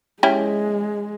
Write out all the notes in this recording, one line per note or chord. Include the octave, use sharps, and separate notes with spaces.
G#3 C#4 E4 G4